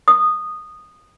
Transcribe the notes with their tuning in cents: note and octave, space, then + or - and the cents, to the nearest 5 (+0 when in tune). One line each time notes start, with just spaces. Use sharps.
D#6 -15